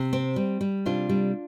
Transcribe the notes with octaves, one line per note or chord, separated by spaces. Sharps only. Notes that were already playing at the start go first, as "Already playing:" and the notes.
Already playing: C3
C4
G3
G3
C3 D4 F4
G3